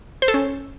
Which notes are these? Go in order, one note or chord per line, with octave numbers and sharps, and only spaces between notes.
C5
A4
C#4